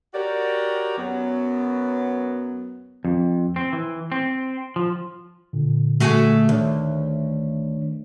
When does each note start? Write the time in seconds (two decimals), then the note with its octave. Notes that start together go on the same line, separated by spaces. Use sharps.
0.14 F#4 G4 A#4 C#5 D5
0.98 F#2 F#3 B3
3.05 F2
3.56 C4
3.73 E3
4.12 C4
4.76 F3
5.53 A#2 D3
6.00 A3 F#4 G#4
6.49 D2 D#3 C#5